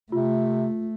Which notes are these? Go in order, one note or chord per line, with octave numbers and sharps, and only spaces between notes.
C3 A3 F4